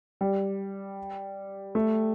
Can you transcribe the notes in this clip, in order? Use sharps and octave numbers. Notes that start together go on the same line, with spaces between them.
G3
A3